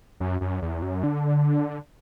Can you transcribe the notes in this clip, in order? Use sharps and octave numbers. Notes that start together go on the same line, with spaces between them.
F#2
F#2
E2
F#2
D3